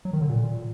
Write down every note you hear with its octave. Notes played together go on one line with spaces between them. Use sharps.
F#3
D#3
D3
A#2